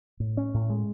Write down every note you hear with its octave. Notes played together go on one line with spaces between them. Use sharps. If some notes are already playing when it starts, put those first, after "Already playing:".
A2
C#4
A2
G#3